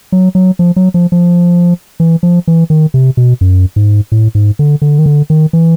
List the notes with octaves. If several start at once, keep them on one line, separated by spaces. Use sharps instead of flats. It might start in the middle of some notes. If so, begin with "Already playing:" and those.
F#3
F#3
F3
F#3
F3
F3
E3
F3
E3
D#3
C3
B2
F#2
G#2
A2
G#2
D3
D3
D#3
D3
D#3
E3